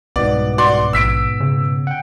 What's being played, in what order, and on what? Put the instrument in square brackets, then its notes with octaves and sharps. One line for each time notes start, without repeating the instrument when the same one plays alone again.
[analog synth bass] C2 [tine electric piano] G#2 B2 B3 [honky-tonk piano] D5
[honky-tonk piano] F#4 D5 C6
[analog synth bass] A#1 [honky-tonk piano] E6 B6 D7
[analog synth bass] C#3
[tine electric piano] F#5 G5